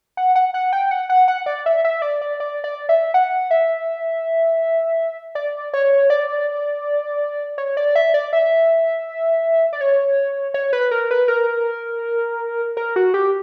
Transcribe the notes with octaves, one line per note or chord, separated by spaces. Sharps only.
F#5
F#5
F#5
G5
F#5
F#5
F#5
D5
E5
E5
D5
D5
D5
D5
E5
F#5
E5
D5
C#5
D5
C#5
D5
E5
D5
E5
D5
C#5
C#5
B4
A#4
B4
A#4
A#4
F#4
G4